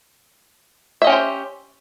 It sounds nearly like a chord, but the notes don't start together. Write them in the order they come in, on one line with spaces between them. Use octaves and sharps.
E5 D#5 C#4 G4 C5